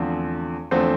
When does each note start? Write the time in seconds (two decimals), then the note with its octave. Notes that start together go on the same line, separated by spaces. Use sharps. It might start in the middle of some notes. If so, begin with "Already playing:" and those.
Already playing: E2 D3 F3 A3 C4
0.71 E2 D3 F3 A3 C4 C5